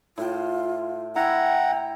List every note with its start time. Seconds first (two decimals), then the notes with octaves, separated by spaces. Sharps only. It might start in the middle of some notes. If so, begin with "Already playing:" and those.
0.18 A2 F4 G5
1.16 E4 F#5 G5 A#5